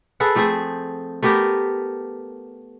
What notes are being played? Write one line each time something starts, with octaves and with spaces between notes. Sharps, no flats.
G#4 A4 B4 F#5
F3 A3 C4 G#4
A3 B3 G4 A#4